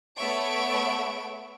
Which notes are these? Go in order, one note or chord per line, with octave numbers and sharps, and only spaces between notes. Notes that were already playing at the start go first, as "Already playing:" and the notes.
A3 B3 C#5 E5 C#6 D7